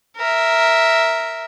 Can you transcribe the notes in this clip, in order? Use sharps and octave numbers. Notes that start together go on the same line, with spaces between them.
A#4 E5